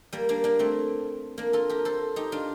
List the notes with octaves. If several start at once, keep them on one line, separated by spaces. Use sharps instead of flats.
G3 A#3
A#3 D4
A#3 D4
A3 C4
A#3 D4
F4 A4
G4 A#4
A4 C5
D#4 G4
D4 F4